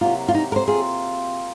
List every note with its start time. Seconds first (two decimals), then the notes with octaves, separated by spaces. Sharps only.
0.01 C3 F#3 A#3 F4
0.28 F4
0.34 D#4
0.52 A#4
0.56 C5
0.67 C4 F4 G#4